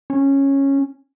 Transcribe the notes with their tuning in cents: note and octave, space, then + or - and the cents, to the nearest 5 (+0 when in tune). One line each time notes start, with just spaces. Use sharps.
C#4 -10